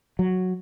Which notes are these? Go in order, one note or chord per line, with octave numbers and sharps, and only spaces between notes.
F#3